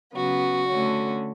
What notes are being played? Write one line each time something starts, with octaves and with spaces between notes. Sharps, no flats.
C#3 F#3 B3 F#4
D3 A3 C#4